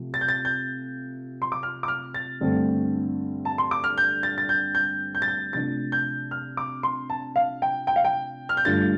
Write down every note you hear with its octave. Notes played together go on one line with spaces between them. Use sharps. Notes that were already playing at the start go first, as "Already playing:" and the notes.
Already playing: C3 F3 A3 F4
A6
G6
A6
G6
C6
D6
F6
D6
F6
A6
G2 D3 A3 C4 A4
A5
C6
D6
F6
G6
A6
A6
G6
G6
G6
A6
G6
C3 F3 A3 D4 A6
G6
F6
D6
C6
A5
F5
G5
G5
F5
G5
F6
G6
G2 D3 A3 D4 F4 A6